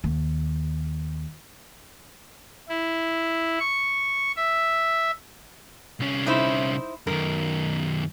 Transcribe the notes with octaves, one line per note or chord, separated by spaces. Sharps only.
D#2
E4
C#6
E5
C2 C#4
D#4 E4 C5
F#2 D#3 A#4